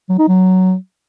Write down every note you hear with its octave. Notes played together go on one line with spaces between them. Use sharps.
F#3
D#4
F#3